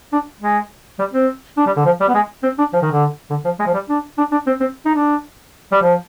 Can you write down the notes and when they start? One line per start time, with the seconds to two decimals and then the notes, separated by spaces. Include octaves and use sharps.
0.13 D4
0.41 G#3
0.99 G3
1.13 C4
1.57 D4
1.66 G3
1.76 D3
1.85 F3
2.00 G3
2.08 B3
2.14 G#3
2.43 C4
2.59 D4
2.73 F3
2.82 D#3
2.92 D3
3.30 D3
3.45 F3
3.59 G#3
3.66 F3
3.73 G3
3.89 D4
4.18 D4
4.32 D4
4.47 C4
4.60 C4
4.85 D#4
4.95 D4
5.72 G3
5.82 F3